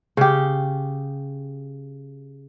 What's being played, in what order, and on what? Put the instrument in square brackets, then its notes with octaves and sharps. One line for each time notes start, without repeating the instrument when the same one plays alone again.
[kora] C#3 G4